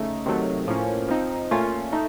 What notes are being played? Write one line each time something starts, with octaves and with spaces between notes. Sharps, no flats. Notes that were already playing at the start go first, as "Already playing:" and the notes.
Already playing: C#3 A3 D#4
C3 D#3 F#3 A3
A2 F3 A#3 C#4
F3 C4 D#4
A#2 A3 C#4 F4
A3 D#4